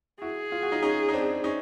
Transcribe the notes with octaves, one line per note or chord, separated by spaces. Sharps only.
E4 F#4 G#4
F4
F#4
D#4 F4
C#4 D#4
D#4
C4 D4
C#4 D#4